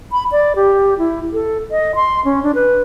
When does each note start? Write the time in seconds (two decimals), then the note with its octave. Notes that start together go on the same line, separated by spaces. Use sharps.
0.12 B5
0.32 D5
0.56 G4
0.99 E4
1.33 A4
1.71 D#5
1.95 C6
2.25 C#4
2.43 D4
2.55 B4